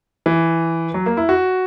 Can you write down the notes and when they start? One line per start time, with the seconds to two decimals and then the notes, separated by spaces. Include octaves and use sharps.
0.26 E3
0.94 F#3
1.06 A#3
1.17 E4
1.29 F#4